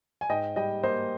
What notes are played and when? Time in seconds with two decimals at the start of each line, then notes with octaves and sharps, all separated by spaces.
0.21 G#5
0.29 G#2 D#5 G5
0.56 G3 D#5 G5
0.83 A#3 C5 D#5